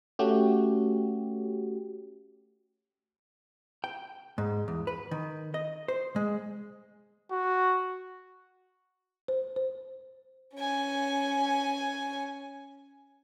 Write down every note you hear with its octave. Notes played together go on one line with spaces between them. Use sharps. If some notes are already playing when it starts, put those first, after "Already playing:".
A3 C#4 F#4 G4
G5
G#2
E2
B4
D#3
D#5
C5
G#3
F#4
C5
C5
C#4 G#5